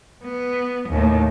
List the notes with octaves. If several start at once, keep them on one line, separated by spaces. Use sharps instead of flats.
B3
D#2 A2